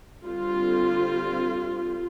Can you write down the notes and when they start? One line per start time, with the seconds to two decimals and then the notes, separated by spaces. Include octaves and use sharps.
0.24 D3 G3 C4 F4